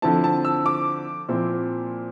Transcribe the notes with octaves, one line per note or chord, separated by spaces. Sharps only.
D3 F3 C4 E4 A5
A5
E6
D6
A#2 F3 C4 E4